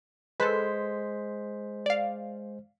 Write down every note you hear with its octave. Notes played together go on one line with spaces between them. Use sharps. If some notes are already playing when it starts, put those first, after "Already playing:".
G#3 A4 B4 C5 B6
D5 F5